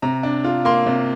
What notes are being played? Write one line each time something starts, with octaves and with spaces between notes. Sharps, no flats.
C3 A#5
D4
F4
A#3 C6
C3